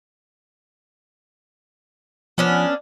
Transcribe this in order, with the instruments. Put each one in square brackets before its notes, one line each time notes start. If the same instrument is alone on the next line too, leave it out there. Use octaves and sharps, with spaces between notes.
[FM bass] F3 [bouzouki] B3 C#4 D4